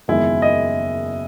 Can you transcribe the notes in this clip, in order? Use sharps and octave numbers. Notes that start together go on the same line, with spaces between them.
F#1 E2 D#3 G#3 E4
D#5